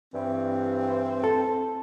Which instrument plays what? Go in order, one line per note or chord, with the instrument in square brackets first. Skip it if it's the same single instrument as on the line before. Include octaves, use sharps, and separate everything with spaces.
[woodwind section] G2 E3 [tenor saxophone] C4
[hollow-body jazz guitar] A4